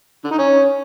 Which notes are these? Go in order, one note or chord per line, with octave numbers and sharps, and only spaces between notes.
D3
D#4
C#4